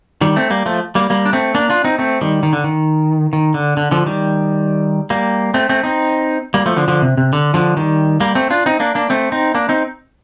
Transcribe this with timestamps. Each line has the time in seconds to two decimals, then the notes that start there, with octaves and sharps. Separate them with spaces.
0.21 D#3 G3
0.36 A3 C4
0.50 G3 A#3
0.66 F3 A3
0.95 G3 A#3
1.10 G3 A#3
1.26 D4
1.33 A3 C4
1.55 A#3 D4
1.70 D4 F4
1.84 C4 D#4
1.98 A3 C4
2.21 D#3 G3
2.43 D#3
2.53 D3
2.64 D#3
3.33 D#3
3.54 D3
3.77 D3
3.91 D3 F3
4.06 D#3 G3
5.10 G3 A#3
5.54 A3 C4
5.69 A3 C4
5.84 C4 D#4
6.54 G3 A#3
6.66 F3 A3
6.77 D3 F3
6.88 D3 F3
7.02 C3
7.17 C3
7.33 D3
7.54 D3 F3
7.77 D#3 G3
8.20 G3 A#3
8.35 A3 C4
8.50 D4 F4
8.66 C4 D#4
8.80 A#3 D4
8.95 A#3 D4
9.10 A3 C4
9.32 C4 D#4
9.55 A#3 D4
9.69 C4 D#4